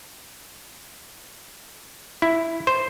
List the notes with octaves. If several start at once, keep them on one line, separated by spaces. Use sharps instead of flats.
E4
C5